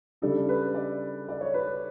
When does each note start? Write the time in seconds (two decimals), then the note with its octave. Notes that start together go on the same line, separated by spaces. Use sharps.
0.22 C#3 G3 D4 A4
0.49 B4
0.74 D5
1.29 D5
1.41 C#5
1.54 B4